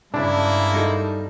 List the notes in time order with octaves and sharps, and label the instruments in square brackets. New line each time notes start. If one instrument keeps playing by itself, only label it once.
[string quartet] G2 [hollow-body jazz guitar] C#3 [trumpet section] G#3 A#3 E4 [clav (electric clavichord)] D4
[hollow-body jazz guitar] G3 D#4 A4